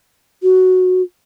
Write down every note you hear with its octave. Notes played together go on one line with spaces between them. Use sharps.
F#4